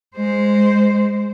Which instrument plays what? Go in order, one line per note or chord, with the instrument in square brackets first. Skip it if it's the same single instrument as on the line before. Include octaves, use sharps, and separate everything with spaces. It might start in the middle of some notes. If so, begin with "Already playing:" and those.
[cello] G#3 C5